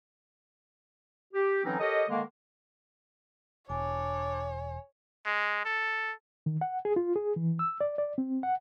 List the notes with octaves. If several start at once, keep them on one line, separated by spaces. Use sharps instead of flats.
G4
D3 E3 F#3 C4 C#4 D#4
G4 A4 A#4 C#5 D#5
D3 D#3 G#3 A#3
E1 D4 C#5 G#5
G#3
A4
D#3
F#5
G#4
F4
G#4
E3
E6
D5
D5
C4
F#5